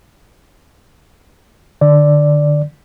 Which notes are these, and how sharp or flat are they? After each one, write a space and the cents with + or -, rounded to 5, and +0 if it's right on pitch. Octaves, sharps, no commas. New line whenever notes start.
D3 +20 D5 +0